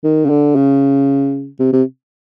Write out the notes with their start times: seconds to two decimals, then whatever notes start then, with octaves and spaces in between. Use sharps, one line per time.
0.04 D#3
0.25 C#3
0.30 D3
0.56 C#3
1.60 C3
1.73 C3